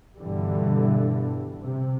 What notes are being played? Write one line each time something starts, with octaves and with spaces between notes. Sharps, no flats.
G2 B2 D3 E3 G3
C3